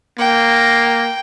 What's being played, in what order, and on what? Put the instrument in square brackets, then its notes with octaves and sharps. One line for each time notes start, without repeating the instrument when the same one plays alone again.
[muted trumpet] A#3 [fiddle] G5